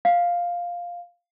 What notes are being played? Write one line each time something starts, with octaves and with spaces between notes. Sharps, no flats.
F5